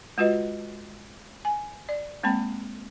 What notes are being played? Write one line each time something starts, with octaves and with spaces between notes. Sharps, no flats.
G#3 F4 F#4 B4 D#5
G#5
D5
G#3 A#3 C4 G5 B5